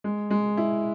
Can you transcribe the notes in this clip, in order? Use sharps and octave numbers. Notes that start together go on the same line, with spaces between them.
G#3
G#3
E4